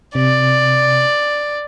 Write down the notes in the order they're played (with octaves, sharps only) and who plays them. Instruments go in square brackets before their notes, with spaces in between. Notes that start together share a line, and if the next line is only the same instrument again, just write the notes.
[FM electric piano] C3 [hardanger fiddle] D5